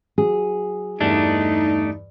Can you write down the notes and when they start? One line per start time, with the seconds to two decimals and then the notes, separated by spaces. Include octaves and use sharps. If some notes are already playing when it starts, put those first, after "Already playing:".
0.18 F#3 G#4
1.01 E2 G2 E3 A3 D4 D#4